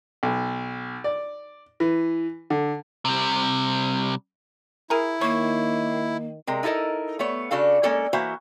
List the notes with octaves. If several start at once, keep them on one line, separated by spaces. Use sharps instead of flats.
B1
D5
E3
D3
C3 G3
E4 G#4 A#4
D#3 A#3 C#5
C3 G#3 A#4
D#4 E4 A4 A#4 D#5
A3 B3 C#5
C#3 D4 F#4 A4 F5
G#3 A#3 C#4 A4 D5
E3 A#3 F#4 C5 E5